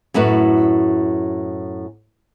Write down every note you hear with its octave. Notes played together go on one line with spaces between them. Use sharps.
F#2 A2 F#4 B4